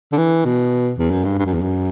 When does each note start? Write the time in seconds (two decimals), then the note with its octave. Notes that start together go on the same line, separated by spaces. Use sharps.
0.12 D3
0.17 E3
0.45 B2
0.98 E2
1.10 F#2
1.24 G2
1.38 G2
1.46 F#2
1.54 E2
1.61 F#2